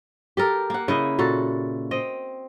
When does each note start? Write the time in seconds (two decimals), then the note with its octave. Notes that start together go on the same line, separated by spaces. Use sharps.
0.37 G4 A4 A#4
0.70 A#3 F#5
0.88 C#3 E4 D#5
1.19 A#2 F#4 A4
1.91 C4 D#5